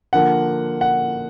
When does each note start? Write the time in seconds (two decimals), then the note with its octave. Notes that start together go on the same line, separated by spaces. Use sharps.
0.13 D3 F3 A#3 F#5
0.81 F#5